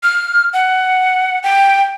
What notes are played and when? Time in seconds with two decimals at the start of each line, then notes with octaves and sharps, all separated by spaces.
0.03 F6
0.53 F#5
1.43 G5